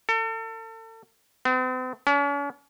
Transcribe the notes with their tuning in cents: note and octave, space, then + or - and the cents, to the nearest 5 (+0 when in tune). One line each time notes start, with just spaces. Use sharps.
A4 +35
C4 -45
C#4 +45